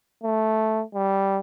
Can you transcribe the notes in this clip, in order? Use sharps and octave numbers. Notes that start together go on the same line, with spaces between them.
A3
G3